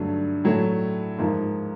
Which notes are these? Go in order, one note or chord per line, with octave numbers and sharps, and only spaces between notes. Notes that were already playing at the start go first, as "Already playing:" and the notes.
Already playing: G2 D3 F#3 A3
A2 F#3 A3
G#2 F3 A#3